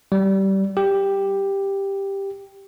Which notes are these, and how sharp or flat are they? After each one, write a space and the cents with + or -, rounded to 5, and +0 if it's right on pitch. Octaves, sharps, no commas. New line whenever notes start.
G3 -20
G4 +5